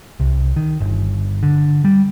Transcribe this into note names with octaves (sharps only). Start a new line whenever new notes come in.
C2
D#3
G1
D3
G3